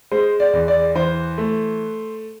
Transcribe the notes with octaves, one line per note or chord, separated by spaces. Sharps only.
G#3 C5
D5
E2
D5
E3 C5
A3